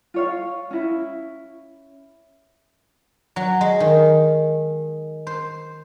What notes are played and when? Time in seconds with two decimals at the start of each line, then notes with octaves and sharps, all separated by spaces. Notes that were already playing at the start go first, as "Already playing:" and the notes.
0.14 F4 C#5 F5
0.71 C#4 E4
3.36 F#3
3.61 G#3
3.80 D#3
5.27 C5